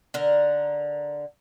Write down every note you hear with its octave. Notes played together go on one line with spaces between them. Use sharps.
D3 A#4